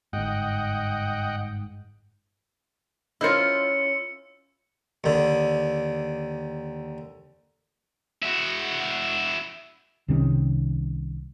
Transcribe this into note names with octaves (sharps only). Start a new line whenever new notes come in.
G1 G#2 D#5 F#5 G5
C#4 E4 F4 A#4 C5 D#5 E6 C#7
D#2 D3
E4 F#4
C2 C3 D#3 C#4